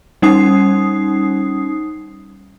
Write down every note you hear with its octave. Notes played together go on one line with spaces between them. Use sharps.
G3 C#4 D#4 D#6 C7